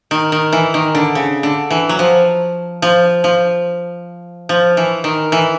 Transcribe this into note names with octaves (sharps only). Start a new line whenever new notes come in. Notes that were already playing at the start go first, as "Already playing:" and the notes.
D#3
D#3
E3
D#3
D3
C#3
D3
E3
F#3
F3
F3
F3
F3
E3
D#3
E3